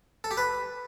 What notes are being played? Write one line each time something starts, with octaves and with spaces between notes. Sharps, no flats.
A4
G4
B4